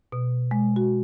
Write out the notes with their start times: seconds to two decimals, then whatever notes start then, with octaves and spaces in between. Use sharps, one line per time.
0.12 B2
0.51 G#3
0.76 F#4